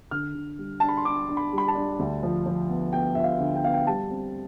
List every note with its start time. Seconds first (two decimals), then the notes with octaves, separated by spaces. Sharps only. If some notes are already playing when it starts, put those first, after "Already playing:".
0.11 D3 F6
0.35 D3
0.58 G3
0.80 D4 A5
0.89 B5
0.97 C6
1.05 D4 D6
1.29 D4
1.37 B5
1.53 G3
1.58 B5
1.68 A5
1.75 D4
1.99 D2
2.23 F3
2.46 F3
2.69 B3
2.93 B3 G5
3.15 F3 E5
3.24 F5
3.40 D3
3.56 G5
3.64 B3 F5
3.73 G5
3.87 G3 A5
4.10 C4